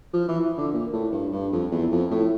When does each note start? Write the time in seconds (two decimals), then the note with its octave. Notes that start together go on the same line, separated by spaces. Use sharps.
0.13 F3
0.28 E3
0.58 D3
0.73 A#2
0.93 A2
1.12 G2
1.32 G2
1.52 F2
1.71 E2
1.91 F2
2.11 A2